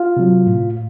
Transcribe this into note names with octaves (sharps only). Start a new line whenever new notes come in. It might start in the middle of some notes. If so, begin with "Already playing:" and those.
Already playing: F4 F5
C3 F#3
A2